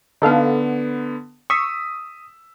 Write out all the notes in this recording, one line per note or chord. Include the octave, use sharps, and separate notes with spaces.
D3 B3 D#4 A4 F5
C#6 D#6 E6 B6